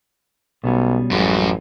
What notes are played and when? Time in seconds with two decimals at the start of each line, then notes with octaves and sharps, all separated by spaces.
0.64 B1 B2 G3 C#4
1.11 A1 F#2 G3 G#3